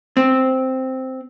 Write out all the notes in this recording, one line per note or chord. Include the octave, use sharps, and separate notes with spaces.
C4